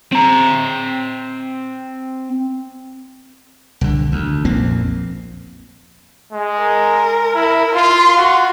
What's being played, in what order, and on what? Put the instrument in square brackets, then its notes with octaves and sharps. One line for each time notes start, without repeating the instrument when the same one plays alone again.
[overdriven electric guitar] C4 A#5
[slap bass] C2 D3
D2
A#1 F2 A#3 C4
[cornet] G#3
[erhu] A#4
[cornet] E4
[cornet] F4 [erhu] C6
[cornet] F#4